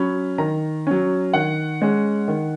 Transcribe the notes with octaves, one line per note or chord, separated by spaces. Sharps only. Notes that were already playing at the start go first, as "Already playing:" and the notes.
Already playing: F#3 C#4 B5
D#3 A#5
F#3 C#4
D#3 F#5
G#3 C#4
D#3